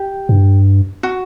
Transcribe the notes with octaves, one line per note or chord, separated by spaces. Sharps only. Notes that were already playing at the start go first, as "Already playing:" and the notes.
Already playing: G4
G2
F#4